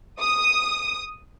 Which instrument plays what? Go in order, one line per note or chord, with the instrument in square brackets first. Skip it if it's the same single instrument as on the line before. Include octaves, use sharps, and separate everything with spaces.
[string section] D#6